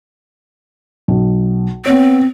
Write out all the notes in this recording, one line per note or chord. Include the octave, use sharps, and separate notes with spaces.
B1
B3 C4 C#5